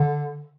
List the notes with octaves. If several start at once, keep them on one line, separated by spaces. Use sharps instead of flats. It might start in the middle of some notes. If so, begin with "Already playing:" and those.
Already playing: D3